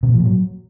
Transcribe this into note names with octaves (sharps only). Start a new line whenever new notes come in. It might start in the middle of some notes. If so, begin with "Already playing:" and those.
C3
A#2
F3
A#2
F#3